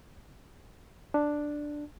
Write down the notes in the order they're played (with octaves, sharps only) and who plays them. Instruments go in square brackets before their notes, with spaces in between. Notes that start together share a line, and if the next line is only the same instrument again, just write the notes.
[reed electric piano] D4